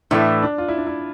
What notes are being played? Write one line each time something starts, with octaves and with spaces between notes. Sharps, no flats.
A2 E3 A3 D4
D4
F4
E4
D4
E4